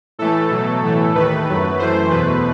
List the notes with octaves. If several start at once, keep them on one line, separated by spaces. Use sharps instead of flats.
A2 E3 A3 A4
B2 F#3 A3 A4
A2 E3 A3
D#2 D#3 A3 B4
F#2 F#3 A3
F#2 E3 A3 C5
E2 B2 A3 B4